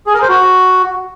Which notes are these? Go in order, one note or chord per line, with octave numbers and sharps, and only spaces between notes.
G#4
A#4
C5
F#4